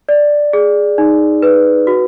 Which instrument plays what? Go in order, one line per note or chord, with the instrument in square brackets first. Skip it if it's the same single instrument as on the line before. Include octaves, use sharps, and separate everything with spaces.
[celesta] D5
G#4
D#4
B4
F#4